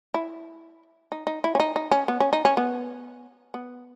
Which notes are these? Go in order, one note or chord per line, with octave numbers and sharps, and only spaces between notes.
E4
D#4
D#4
E4
C#4
D#4
D#4
C#4
B3
C#4
D#4
C#4
B3
B3